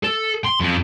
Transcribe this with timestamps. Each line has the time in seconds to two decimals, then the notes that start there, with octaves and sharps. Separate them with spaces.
0.03 A4
0.44 C6
0.60 F2